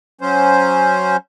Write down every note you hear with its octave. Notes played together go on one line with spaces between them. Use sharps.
F#3 C#4 C5